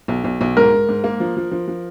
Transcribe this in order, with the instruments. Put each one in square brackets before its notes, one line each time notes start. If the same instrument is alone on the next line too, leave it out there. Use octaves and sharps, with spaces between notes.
[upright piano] B1
B1
B1
[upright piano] G#2 [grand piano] A#4
[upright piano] G#2
G#2
A#3
F3
F3
F3
F3